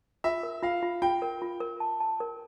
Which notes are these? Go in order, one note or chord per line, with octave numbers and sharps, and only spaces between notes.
F4 E5
A#4
F4 F5
F4
F4 G5
A#4
F4
A#4
A5
A5
A#4